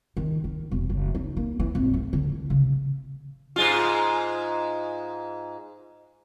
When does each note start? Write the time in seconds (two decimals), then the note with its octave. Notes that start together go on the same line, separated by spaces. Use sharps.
0.17 D#3
0.44 D#3
0.71 E1
0.90 F#1
1.15 D#4
1.37 A#3
1.60 E3
1.75 G#1
1.94 A3
2.13 D3
2.29 E4
2.50 C#3
3.56 G#2 G#3 F4